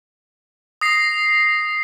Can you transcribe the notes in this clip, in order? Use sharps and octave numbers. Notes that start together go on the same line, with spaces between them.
D#6 A#6 C7